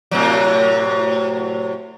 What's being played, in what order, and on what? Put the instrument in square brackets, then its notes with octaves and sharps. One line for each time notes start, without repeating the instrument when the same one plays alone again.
[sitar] A2 C3 F#3